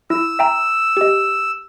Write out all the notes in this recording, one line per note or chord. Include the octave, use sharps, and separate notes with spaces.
E4 E6
E5 G5 A#5
G4 D#5